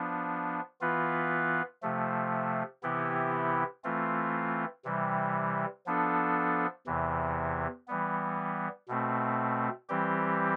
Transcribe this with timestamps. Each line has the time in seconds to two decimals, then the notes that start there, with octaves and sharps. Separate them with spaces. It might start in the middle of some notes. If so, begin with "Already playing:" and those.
Already playing: F3 B3 D4
0.81 E3 B3 F4 B4
1.82 C3 F3 A3
2.83 C3 E3 B3 E4 G4
3.84 E3 A3 C4 F4
4.85 C3 E3 G3
5.86 F3 B3 D4 A4
6.87 E2 C3 E3
7.88 E3 G3 B3
8.88 B2 A3 C4
9.89 E3 G3 C4 G4